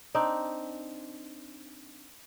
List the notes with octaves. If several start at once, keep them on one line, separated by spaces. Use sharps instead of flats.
C4 D4 D#4